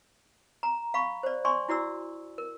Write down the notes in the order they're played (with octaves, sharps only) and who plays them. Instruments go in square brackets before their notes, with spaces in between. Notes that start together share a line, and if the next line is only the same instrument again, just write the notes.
[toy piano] A#5
F5 B5 C#6
C5 D5
D5 G#5 C6 C#6
E4 F#4 D5 E6
A#4